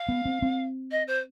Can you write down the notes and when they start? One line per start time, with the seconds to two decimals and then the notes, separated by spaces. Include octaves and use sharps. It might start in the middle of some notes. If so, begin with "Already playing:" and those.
Already playing: F5
0.09 B3
0.25 C4
0.42 C4
0.91 D#5
1.07 C5